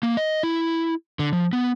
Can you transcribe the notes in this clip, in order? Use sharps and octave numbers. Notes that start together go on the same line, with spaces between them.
A#3
D#5
E4
D3
F3
B3